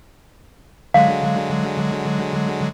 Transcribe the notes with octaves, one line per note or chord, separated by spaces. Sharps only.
D3 F#3 G#3 F5